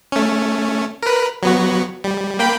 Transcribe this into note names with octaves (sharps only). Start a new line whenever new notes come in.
A3 C#4
A#4 B4
F#3 B3 F#4
G3
A#3 G5 B5